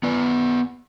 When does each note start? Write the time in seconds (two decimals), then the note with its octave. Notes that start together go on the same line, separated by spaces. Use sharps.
0.03 B3 B4 D5